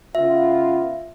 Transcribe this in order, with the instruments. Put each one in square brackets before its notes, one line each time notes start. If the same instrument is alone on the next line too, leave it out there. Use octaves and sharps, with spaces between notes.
[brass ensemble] C#3 B3 F4 [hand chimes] E5